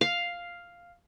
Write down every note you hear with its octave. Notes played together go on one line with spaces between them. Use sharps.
F5